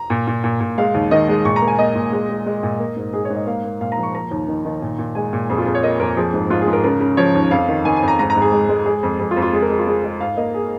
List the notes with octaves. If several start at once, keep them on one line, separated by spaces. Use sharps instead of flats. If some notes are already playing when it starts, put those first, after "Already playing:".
Already playing: A#5
A#2
A#2
A#2
A#2
G#3 F5
D#2
D#3 D#5
G#3
A#2 C#6
A#5
A#3
G#5
A#3 D#5
A#2
G#3
G#3
G#3
A#2
A#3
G#2
G#2 G#4
C#5
G#2
D#5
A#3 F5
A#3
A#2 F5
A#5
F3
C#6
A#3 A#5
D#2
D#3
D#3
A#2
A#2
G#3 G#5
A#2
F2 G#4
F4
F2 G#4
C#5
A#3 D#5
F2 A#4
F3 G#4
G#2
G#2 F4
G#4
G#2
A#4
C#3 A#4
C#3
F3 C#5
D#2
F2 F5
D#3
D#3 G#5
G#5
F2
A#5
G#2 A#5
A#5
G#2
G#4
G#3
G#3
G#3 G#4
F2
F2 G#4
F4
F2
F4
G#3 G#4
A#4
G#3
F4
G#3 G#4
G#3
G#2 F5
A#3 D#5
G#4